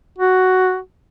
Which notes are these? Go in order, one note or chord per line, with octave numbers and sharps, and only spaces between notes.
F#4